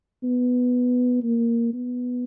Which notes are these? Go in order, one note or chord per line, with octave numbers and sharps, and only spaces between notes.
B3
A#3
B3